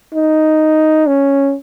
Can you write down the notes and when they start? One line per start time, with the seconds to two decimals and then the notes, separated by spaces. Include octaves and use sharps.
0.14 D#4
1.07 C#4